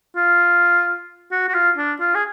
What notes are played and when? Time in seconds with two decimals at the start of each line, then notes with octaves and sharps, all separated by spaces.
0.16 F4
1.31 F#4
1.49 F#4
1.54 F4
1.77 D4
2.00 F4
2.15 G#4